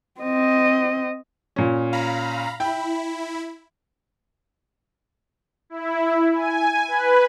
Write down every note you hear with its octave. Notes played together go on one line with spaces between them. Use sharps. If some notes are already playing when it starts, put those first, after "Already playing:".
C4 D#5
A#2 C#4
F5 A#5 B5
E4 G5 B5
E4
G#5
B4